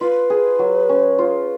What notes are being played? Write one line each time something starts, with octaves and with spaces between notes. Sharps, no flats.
F4 B4
G#4
F#3
C#4
F4